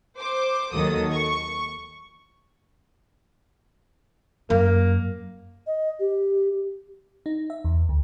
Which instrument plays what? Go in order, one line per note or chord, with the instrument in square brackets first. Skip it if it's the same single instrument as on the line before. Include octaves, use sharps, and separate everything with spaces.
[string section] C5 D6
D#2 D#3 F#3 F#4 A4 D#6
C#6
[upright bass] F#2 [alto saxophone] A#3
[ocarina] D#5
G4
[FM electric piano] D#4
E5
E2
D2